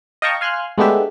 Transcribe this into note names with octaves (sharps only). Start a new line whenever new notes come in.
D#5 F5 G5 A5 A#5 C#6
F5 G#5 C6 F6 F#6
G#3 A3 B3 D4 G4 E5